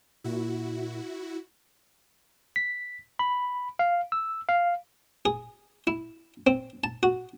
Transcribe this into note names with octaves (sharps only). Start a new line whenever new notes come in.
A#2 E4 F#4
B6
B5
F5
E6
F5
G#4
E4
C4
A5
F#4